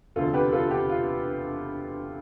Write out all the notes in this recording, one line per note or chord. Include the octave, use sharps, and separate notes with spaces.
E1 D2 C3 F4 A4
G4 B4
F4 A4
G4
F4